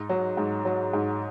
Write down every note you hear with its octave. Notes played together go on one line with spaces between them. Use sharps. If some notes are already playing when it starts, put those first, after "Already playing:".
Already playing: G#2 D#4
F#3
G#2
F#3
G#2